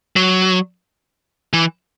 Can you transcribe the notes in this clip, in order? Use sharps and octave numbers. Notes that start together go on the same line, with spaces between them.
F#3
E3